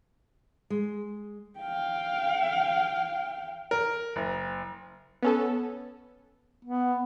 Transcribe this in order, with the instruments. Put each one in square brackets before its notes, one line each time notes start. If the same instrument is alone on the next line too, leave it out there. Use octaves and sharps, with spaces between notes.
[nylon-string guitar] G#3
[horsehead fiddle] F5 G5
[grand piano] A#4
F#1
[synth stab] B3 C#4 A4
[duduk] B3